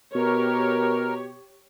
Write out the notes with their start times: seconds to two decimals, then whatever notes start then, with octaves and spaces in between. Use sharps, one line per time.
0.15 B2 G4 A#4 C#5